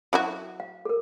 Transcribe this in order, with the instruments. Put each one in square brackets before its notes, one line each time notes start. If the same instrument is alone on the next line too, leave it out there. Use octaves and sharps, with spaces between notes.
[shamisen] F#3 E4 F#4
[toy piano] F5
A4 A#4